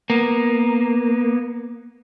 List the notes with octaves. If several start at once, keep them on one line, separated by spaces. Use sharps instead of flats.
A#3 B3